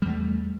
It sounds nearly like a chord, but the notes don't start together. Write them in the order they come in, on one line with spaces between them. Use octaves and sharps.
G3 E2 A3